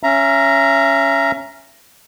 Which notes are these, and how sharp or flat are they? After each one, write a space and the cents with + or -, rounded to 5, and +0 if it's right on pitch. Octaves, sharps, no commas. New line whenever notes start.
C#4 +0 E5 +30 A#5 +0